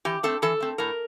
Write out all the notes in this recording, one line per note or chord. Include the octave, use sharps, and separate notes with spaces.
E3 G4
A3 C4 A4
E3 A4
A3 C4
A2 A#4